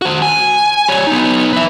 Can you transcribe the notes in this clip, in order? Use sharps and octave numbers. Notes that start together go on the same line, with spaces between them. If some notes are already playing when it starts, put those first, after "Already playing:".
F#4 C5
G#5
G3 C#5
B3 D#4
B4 E5